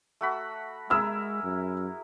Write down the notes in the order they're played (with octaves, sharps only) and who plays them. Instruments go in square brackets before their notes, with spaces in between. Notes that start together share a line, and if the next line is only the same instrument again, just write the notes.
[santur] A3 F#4 B5
[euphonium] G#3 [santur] E4 G#4 A#4 [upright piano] E6 F6
[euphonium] F#2